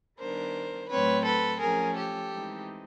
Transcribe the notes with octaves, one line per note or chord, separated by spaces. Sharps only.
D#3 G3 B3 D4 A#4 C5
A2 F#3 A3 C4 B4 C#5
A4 B4
F3 A3 C#4 G#4 A#4
G4 A4
E3 G#3 C4 D#4